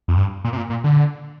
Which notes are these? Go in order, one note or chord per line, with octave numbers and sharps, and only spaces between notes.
F2
G2
A#2
C3
A#2
A#2
D3